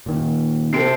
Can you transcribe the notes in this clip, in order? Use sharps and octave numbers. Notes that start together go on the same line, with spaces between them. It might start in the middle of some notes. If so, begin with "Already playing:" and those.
A#2 D#3
C3 C4 A4 C7 D7